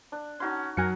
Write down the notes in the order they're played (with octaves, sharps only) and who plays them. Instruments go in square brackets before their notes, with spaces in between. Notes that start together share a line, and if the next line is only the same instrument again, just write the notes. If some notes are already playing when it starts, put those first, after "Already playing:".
[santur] D4
[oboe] C#4 [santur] D#4 F#4 A5 [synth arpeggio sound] C6
[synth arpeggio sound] F#2 G#5 G#6 [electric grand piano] F#3 C#7 [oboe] A#4 [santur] F#5